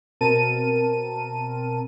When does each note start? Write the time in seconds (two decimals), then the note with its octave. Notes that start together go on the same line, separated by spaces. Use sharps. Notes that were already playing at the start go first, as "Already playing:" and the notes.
0.21 B2 C4 A#4 A5 D#7